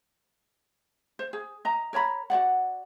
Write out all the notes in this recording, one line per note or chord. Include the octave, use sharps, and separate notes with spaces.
C5
G#4
D#5 A#5
A#4 C#5 A#5 B5
F#4 C5 D5 F#5